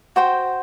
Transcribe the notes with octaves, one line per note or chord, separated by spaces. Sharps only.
F#4 C5 G5